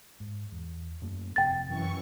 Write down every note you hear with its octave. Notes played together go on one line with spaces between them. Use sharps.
G#2
E2
F#2 A3 A#3
G1 F2 C3 G5 A6
F#2 E3 C#6